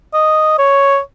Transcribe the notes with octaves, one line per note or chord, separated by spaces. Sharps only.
D#5
C#5